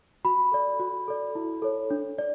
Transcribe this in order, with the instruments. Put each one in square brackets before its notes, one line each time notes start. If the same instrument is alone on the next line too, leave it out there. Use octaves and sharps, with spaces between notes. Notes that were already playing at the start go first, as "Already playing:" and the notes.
[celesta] F#4 B5
A4 D5
F#4
A4 D5
E4
A4 C#5
D4
D5